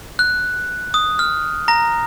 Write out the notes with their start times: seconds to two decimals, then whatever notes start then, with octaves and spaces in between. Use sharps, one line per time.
0.19 F#6
0.94 D#6
1.19 F6
1.68 A#5 A#6